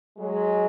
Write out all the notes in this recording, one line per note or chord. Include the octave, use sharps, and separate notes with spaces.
F#3 G#3